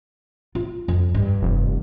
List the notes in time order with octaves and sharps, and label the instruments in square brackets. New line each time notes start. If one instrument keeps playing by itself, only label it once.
[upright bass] F4
F2
G2
[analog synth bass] F1